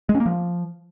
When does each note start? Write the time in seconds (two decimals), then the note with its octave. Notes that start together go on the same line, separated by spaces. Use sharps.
0.09 G#3
0.15 C#4
0.20 A#3
0.26 F3